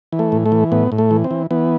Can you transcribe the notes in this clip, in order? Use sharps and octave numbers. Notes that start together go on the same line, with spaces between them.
E3
A3
A2
A3
E3
A2 B3
A2
A3
E3
C4
E3
E3 B3